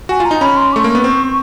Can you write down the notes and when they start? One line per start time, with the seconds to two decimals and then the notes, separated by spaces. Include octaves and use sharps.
0.09 F#4 G#5
0.20 F4
0.25 A#5
0.31 D#4
0.41 C#4 B5
0.57 C6
0.73 D6
0.76 A3 C#6
0.84 A#3
0.95 B3
1.04 C4